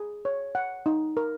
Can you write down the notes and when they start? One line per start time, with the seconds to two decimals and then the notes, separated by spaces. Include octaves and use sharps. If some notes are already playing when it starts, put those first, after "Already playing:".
Already playing: G#4
0.25 C#5
0.55 F#5
0.86 D#4
1.17 A#4